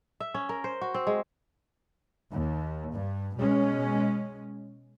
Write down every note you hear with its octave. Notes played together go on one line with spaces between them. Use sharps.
E5
C#4
A#4
C5
F#4
C4
G#3
D#2
G2
B2 G#3 C#4